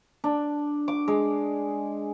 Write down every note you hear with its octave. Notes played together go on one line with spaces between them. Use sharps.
D4
D6
G#3